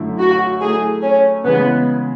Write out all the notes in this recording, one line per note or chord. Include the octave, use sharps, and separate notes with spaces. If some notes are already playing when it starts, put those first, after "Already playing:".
Already playing: F#2 D3 A3 E4
F#4
F#3 A3 E4 G#4
C#4
C#3 E3 G#3 B3